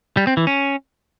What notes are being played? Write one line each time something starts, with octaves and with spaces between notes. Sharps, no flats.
G3
C4
E3
C#4